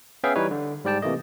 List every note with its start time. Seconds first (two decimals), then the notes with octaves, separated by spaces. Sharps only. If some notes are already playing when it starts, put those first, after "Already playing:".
0.24 B3 C#4 G#4 E5 F5 G5
0.36 E3 G3 D#4 B4 C#5
0.51 D3
0.84 G#2 G3 D5 G5 A5
1.02 C3 E3 A3 A#3 D#5